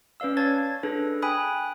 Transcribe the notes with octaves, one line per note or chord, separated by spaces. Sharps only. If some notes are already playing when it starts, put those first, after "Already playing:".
C#4 B4 D5 F5 E6
C#5 A5 G#6 A6
D4 G#4 A4 B4
G5 G#5 B5 D#6 F#6